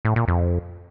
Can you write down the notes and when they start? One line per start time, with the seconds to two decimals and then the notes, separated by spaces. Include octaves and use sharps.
0.05 A2
0.16 A#2
0.28 F2